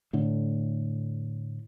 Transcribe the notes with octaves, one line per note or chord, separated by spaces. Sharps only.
A2 D3